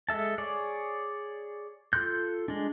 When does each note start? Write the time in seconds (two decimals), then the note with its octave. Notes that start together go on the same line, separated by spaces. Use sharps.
0.09 G#3 A4 E5 A5
0.38 G#4 C#5 D5
1.93 F4 A4 C6 F#6 G6
2.48 G#3 D4